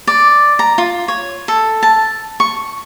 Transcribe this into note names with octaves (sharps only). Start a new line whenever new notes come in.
D5
A#5
F4
C#5
A4
A5
C#6